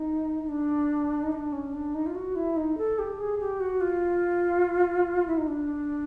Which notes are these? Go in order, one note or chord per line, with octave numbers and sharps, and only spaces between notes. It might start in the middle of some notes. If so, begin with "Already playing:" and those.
Already playing: D#4
D#4
D4
D#4
D4
C#4
D4
D#4
F4
F#4
E4
D#4
A4
G4
G#4
G4
F#4
F4
E4
D#4
D4